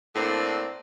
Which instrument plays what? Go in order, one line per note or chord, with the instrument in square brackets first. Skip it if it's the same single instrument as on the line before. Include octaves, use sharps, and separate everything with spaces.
[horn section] A2 A#3 C4 D4